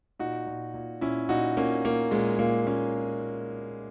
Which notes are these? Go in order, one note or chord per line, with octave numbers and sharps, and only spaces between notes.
A#2 D#4 F#4
A#2
A#2
A#2 C#4 E4
A#2 D#4 F#4
A#2 A#3 C#4
A#2 A#3
A#2 G#3
A#2 A#3
A#2 A#3 C#4